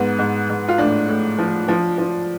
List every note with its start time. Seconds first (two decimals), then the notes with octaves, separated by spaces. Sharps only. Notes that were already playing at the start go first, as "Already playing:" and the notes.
Already playing: G#2 B3
0.19 G#2
0.49 G#2
0.68 F4
0.78 A2 D4
1.09 A2
1.38 F3
1.68 F3
1.98 F3